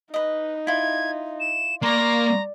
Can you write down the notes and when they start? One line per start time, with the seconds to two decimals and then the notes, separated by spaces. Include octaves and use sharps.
0.14 D#4 B4 D#5
0.67 E4 F4 G#6
1.40 E7
1.83 A#3 D5 A#5 C6 C#6